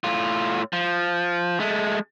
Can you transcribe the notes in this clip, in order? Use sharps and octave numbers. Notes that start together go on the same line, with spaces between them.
A2 F4
F3
G#3 A3